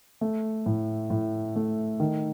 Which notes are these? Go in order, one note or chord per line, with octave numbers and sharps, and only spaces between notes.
A3
A2
A2
A3
D#3